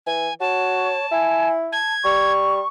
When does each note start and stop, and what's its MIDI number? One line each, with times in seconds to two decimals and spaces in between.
0.06 0.29 52
0.06 0.34 80
0.40 0.95 66
0.40 1.06 73
0.40 1.48 81
1.11 1.77 64
1.11 1.51 80
1.72 1.93 81
1.72 2.33 92
2.04 2.60 55
2.04 2.68 85